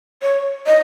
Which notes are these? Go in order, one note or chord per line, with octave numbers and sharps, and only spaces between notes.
C#5
D#5